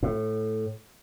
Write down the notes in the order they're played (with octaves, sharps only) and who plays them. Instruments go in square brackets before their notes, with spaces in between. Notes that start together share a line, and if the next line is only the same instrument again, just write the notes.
[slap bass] A2